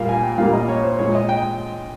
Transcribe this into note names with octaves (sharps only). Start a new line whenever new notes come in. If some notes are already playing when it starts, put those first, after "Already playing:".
Already playing: A#2 G3 A#3 F5
G#5
G5
A#2 G3 A#3 F5
D#5
C#5
C5
A#2 G#3 C#5
D#5
G5